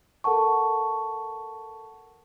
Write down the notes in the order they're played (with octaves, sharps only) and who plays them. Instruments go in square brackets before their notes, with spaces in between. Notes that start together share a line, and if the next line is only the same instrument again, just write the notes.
[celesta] A4 A#4 F#5 A5 C#6